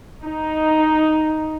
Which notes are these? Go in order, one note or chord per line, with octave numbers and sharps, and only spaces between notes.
D#4